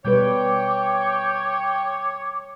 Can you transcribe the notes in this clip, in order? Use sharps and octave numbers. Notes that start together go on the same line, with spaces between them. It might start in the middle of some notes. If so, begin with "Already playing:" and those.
B2 G3 B4 C#5 G5 D6